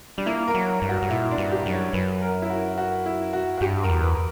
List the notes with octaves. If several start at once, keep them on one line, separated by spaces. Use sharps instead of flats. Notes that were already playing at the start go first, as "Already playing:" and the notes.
G3 D4
A#3 E4
A#4
F#3
G2
F#4
G2
A#2 E4
D4
G2
G4
F#2
C#5
F#2 B4
A#4
E4
F#4
F#4
E4
F#4
F#4
G2 G4
F#2 A#4
E2
B4